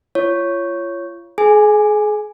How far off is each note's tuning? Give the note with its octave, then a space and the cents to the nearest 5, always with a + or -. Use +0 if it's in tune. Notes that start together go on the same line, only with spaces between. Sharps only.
F4 -30 C#5 +0
G#4 +35 G#5 +0